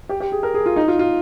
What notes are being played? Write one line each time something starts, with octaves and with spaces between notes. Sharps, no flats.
G4
G4
G#4
A#4
G#4
F4
D#4
F4
F4